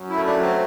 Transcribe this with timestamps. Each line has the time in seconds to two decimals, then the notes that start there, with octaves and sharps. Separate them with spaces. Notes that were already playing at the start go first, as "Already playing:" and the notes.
Already playing: F#2
0.10 E4
0.15 A3
0.26 D4
0.37 F#3
0.43 C4